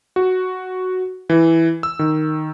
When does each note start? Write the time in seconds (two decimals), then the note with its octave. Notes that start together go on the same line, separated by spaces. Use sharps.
0.16 F#4
1.30 E3
1.83 E6
1.99 D#3